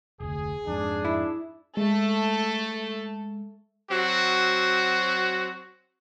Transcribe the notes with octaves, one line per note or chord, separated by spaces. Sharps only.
F1 D2 G#4
F2 G#2 D4
E4
G#3 A3 A4
F#3 C4 F#4